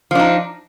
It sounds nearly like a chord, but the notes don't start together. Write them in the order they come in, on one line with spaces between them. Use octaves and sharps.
F3 D4 D#4